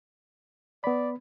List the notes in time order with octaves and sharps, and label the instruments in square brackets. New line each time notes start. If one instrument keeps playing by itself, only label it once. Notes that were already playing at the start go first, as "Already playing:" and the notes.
[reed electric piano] B3 B5 [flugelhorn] D5